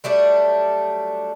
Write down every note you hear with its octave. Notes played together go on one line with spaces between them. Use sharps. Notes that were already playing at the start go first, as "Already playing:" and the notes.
F#3 G3 A3 D4